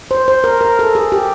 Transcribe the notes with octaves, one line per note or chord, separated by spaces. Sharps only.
C5
C5
A#4
A#4
A4
G#4
G4